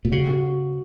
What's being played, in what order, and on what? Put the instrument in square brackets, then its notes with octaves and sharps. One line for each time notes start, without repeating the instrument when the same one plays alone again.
[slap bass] A#2
[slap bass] C#3 [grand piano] F#4
[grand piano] F#4